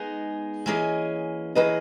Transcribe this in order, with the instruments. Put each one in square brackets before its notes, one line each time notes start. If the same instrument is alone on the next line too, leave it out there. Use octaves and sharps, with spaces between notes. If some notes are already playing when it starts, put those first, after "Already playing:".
Already playing: [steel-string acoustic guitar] G#3 B3 D#4 G#4
E3 A#3 C#4 G#4 D#5
[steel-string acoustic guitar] E3 A#3 C#4 G#4 D#5 [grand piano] B4